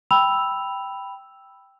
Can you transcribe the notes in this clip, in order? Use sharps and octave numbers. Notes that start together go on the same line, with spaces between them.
G5 B5 E6 F7